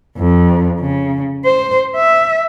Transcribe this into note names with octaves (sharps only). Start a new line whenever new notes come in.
F2
C#3
C5
E5